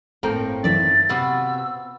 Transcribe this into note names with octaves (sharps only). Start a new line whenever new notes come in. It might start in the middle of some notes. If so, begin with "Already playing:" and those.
G1 A2 A#3 C4 A4 A#4 G5
F#2 D#3 E3 D5 E5 A6
C3 B3 F4 F#4 E6